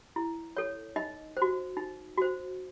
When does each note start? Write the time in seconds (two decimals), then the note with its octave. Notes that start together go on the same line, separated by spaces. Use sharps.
0.16 E4
0.57 A4 C#5
0.96 D#4 D#5
1.37 F#4 C5
1.77 D#4
2.17 F#4 C5